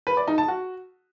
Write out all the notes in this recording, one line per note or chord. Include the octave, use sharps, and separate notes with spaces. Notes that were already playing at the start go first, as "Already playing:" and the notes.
B4
D5
D#4
A5
F#4